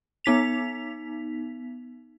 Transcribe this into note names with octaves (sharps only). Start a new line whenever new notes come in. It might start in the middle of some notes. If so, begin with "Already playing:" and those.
B3 D#4 B6 F7